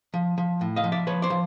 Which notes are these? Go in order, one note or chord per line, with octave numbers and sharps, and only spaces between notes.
F3
F3
A2
D#5 F5
F3
D5 E5
F3 B4 C#5
C5 D5
F3